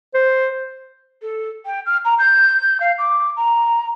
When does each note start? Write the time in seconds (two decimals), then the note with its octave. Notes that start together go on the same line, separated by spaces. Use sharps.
0.14 C5
1.22 A4
1.65 G5
1.86 F6
2.05 A#5
2.19 G6
2.80 F5
2.98 D6
3.36 A#5